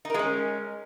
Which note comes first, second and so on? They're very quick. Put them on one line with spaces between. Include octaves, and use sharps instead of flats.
D#4 A#4 G#3 C#4